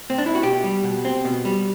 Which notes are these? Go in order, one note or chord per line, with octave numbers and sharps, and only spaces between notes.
C4
D4
E4
F#4
B2 G4
G3
B2
C4
B2
G3